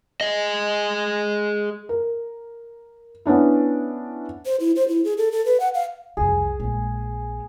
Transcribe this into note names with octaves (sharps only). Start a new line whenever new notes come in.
G#4 D#5
A#4
B3 C#4 D4 E4
C5
E4
C5
E4
G#4
A4
A4
B4
F#5
F5
C2 F2 G#4
A#1 G#3